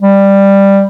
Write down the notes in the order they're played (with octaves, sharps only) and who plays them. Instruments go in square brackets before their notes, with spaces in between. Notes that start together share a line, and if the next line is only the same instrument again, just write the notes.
[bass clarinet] G3